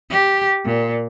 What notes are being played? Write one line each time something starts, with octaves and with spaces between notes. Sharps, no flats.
G4
A#2